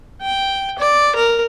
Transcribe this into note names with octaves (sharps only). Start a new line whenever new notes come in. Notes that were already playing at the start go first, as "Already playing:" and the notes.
G5
D5
A#4